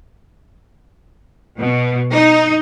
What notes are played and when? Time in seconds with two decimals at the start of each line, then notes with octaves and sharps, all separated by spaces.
1.59 B2
2.11 D#4